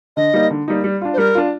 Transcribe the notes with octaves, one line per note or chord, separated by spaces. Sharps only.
D3 D#5
G3 A#3 D#4
D3
G3 A#3 D#4
G3
D4 F4
C5
G3 A#4
D4 F4